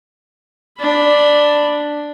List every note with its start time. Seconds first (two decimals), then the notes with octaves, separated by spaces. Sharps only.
0.79 D4 B5